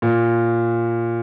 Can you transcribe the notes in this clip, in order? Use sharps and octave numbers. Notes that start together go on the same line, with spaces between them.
A#2